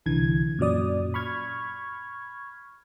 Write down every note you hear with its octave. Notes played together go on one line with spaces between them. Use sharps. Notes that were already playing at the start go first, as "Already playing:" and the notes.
C2 D3 E3 G#6
F#2 A#2 F#3 D5 D#6
B5 C#6 F6 G#6